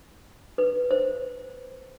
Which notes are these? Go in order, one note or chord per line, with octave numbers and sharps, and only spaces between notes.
B4
C5